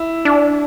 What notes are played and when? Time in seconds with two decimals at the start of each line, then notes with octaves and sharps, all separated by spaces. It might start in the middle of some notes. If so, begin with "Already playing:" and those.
Already playing: E4
0.25 D4